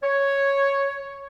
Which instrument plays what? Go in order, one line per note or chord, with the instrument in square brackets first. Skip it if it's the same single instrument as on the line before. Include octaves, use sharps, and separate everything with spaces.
[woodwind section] C#5